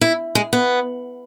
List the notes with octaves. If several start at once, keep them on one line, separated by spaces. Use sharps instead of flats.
E4
G#3
B3